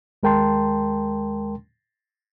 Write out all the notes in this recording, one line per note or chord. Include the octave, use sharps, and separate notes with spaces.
D#2 G#3 A#4 G5 A5 C6